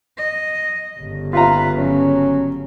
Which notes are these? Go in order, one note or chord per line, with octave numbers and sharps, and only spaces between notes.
D#5
G1 C#3
F4 B4 A#5
F#3 C#4